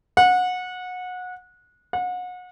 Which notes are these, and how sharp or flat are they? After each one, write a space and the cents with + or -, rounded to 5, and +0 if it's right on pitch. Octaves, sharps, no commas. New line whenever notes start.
F#5 -25
F#5 -35